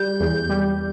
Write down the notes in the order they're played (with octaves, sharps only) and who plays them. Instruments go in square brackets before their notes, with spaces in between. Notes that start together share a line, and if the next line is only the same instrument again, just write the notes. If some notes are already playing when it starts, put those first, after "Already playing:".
Already playing: [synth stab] G3 [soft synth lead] G6
[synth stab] E2
G3